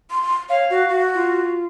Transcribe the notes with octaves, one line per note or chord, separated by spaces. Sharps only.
C6
C#5 F5
F#4
F#4
F4